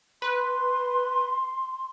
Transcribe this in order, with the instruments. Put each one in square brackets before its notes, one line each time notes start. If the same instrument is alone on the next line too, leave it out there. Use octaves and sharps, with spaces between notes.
[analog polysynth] B4 [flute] C6